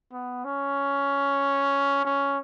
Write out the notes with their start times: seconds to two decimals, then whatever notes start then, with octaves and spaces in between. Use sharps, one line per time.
0.13 B3
0.45 C#4
2.05 C#4